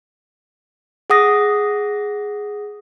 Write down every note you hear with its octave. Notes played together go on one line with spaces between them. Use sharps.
G#4 F#5 D#6 A#6